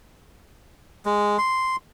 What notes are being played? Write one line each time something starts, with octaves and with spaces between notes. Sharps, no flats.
G#3
C6